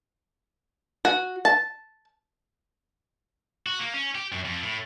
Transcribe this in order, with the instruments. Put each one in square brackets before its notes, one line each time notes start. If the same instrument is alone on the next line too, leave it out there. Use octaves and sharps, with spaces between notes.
[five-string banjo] F#4
A5
[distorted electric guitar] F#4
A#3
C#4
G4
F#2
F2
A2